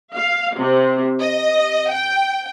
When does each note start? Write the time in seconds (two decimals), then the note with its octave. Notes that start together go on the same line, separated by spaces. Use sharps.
0.15 F5
0.57 C3
1.19 D#5
1.91 G5